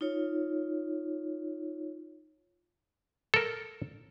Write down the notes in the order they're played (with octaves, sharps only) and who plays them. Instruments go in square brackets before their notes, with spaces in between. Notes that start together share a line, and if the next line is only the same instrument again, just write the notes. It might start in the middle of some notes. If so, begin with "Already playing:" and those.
[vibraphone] D#4 F4 C#5
[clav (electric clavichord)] A4 A#4